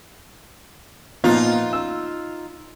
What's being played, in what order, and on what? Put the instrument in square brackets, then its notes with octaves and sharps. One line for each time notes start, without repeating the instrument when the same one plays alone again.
[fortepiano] A#2 F3 B3 [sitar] D#4 F4
[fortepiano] E6